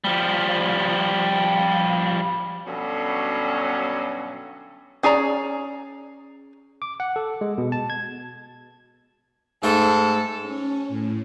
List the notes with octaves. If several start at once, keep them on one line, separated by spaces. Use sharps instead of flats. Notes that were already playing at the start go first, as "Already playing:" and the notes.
F3 G3
G2 B2 D3 F#3 C#4
C#4 G#4 D5 A#5
D6
F#5
A4
G#3
B2
A5
G#6
G#2 A3 A4
C#4
A2